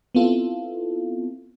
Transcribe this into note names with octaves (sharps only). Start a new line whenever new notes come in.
B3 C4 E4 F4 A4